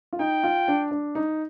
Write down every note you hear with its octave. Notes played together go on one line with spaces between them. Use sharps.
F4
D#4 G5
F4
D4
D4
D#4